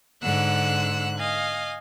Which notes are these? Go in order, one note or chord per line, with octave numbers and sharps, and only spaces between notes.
G#2 D3 F#5 E6 F#6
D#5 F5 G#5